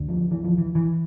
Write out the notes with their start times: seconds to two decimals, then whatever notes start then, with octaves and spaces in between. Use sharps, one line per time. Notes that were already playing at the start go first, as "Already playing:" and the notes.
Already playing: D2 D3
0.08 F3
0.31 E3
0.44 F3
0.58 E3
0.75 E3